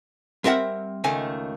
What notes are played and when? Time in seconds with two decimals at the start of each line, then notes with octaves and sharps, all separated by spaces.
0.44 G3 C4 A#4 E5 F#5
1.04 C#2 D#3 A3 G#5